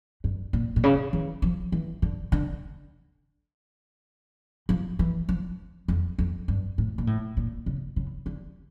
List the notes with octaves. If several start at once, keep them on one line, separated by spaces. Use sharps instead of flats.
G2
A#2
A#2
C#3
E3
F3
E3
D3
D3
F3
E3
F3
F2
F2
G2
A2
A#2
A2
A#2
C#3
C#3
D3